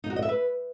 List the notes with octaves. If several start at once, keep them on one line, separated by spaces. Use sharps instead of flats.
D#4
F#4
D#5
E5
B4